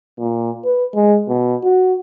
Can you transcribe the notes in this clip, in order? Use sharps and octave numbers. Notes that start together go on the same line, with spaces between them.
A#2
B4
G#3
B2
F#4